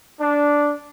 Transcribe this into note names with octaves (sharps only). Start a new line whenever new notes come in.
D4